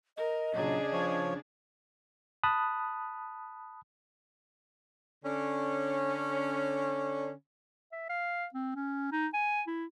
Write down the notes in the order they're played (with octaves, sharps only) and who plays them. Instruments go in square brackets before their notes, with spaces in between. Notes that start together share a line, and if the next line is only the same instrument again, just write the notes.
[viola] A#4 [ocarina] D#5
[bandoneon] A#2 F#3 [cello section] C#3 D4 [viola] G#4
[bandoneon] F3 C#5
[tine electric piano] A5 B5 D#6 F#6
[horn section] D3 C#4
[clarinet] E5
F5
C4
C#4
D#4
G#5
E4